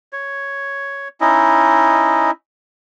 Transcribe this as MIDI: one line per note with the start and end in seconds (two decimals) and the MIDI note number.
0.13 1.08 73
1.21 2.31 61
1.21 2.31 63
1.21 2.31 64
1.21 2.31 75